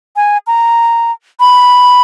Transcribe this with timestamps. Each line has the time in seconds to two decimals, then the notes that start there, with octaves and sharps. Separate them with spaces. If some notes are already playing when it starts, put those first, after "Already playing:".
0.16 G#5
0.47 A#5
1.40 B5